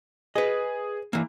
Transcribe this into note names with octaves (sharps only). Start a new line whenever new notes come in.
G#4 B4 D#5
E3 A#3